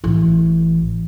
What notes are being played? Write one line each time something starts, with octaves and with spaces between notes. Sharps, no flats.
A1 E3